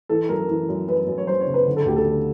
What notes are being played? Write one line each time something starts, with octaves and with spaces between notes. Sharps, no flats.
E3 A4
F#2 A#4
E3
F#2
F#2 B4
F#2
C#5
F#2 C5
C#5
C#3
B4
D3
A4
D2 G4
A4
D3